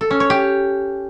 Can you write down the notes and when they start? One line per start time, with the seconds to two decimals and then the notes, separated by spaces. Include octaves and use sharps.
0.01 A4
0.11 C#4
0.20 C#5
0.30 G4